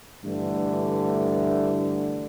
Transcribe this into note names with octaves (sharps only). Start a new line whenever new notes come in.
G2 D3 E3 A3